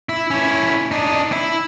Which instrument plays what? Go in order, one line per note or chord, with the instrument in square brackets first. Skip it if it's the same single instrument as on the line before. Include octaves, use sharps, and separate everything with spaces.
[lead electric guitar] E4
C#4 E4
D4 D#4
E4